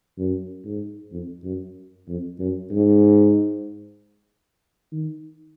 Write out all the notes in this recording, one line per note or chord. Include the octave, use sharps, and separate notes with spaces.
F#2
G#2
F2
F#2
F2
F#2
G#2
D#3